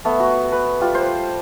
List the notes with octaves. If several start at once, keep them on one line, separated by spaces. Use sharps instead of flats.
A3 B3
F#4
B4
G3 F4
C5